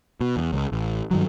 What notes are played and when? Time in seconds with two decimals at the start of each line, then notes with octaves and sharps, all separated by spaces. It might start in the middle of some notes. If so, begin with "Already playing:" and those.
0.21 B2
0.37 E2
0.53 C#2
0.72 A1
1.11 G2 D#3 F#3